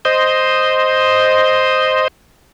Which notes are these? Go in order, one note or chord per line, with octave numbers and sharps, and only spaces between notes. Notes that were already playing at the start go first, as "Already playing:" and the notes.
C5 D#5